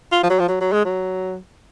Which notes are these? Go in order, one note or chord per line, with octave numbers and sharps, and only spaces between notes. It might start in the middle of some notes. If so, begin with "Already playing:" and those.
F4
F3
F#3
F3
F#3
F#3
G#3
F#3